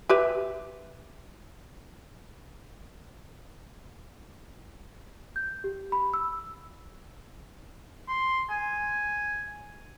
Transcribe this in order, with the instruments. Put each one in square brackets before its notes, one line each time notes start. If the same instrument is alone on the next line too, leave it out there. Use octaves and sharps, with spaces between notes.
[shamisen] G4 B4 E5
[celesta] G6
G4
B5
E6
[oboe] C6
G#5